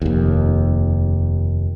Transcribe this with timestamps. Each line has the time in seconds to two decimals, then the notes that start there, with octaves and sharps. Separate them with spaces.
0.02 F1 D#2